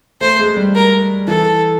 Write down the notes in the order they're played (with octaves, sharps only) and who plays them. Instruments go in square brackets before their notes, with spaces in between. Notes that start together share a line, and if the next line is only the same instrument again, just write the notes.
[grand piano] A3 [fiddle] C5
[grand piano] G#3
G3
[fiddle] A#4
[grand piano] E3 [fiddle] A4